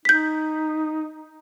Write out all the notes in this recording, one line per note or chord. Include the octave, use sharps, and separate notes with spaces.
D#4 G6 B6